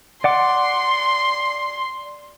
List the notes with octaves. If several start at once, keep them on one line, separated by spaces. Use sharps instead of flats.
D5 F#5 C6 D6